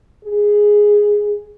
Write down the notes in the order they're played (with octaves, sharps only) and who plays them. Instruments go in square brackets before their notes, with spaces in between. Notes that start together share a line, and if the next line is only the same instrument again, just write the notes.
[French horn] G#4